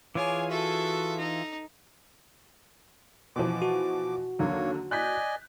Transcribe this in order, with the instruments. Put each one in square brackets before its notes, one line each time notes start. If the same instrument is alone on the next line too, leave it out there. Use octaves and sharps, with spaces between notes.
[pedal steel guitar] E3 F4 G#4 [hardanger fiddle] C#5 G#5 [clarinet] D6
[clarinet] F#4 [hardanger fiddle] A4 E5
[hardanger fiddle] D#4
[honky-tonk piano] B2 E3 F3 [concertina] D6
[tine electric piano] F#4
[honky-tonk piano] D#2 D3 F#3 [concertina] A#3 C#5
[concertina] D5 D#5 G#5 [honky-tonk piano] F#6 G6 B6